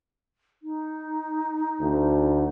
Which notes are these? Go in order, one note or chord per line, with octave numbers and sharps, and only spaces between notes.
D#4
D2